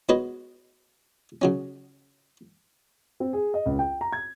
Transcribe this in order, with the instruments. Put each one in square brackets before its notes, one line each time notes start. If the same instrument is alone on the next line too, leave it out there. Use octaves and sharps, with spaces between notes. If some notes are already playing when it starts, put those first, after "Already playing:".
[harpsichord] G#2 B3 F#4 B4 C#5 D#5
C#3 F#3 C#4
[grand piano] C4
G#4
D#5
C#2
G5
A#5
G#6